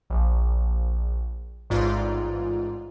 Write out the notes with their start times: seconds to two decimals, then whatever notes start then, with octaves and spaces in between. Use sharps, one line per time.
0.10 A#1
1.70 A1 G#2 F4 D5